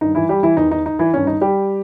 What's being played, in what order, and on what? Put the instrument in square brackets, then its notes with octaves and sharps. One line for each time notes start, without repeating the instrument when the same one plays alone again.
[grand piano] G2 D#3 D#4
E3 E4
G3 G4
E3 E4
E2 D#3 D#4
D#4
D#4
E3 E4
G2 D#3 C#4
D#4
G3 G4